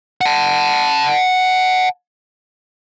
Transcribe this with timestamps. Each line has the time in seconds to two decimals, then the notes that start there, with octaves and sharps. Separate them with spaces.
0.21 F#5 A5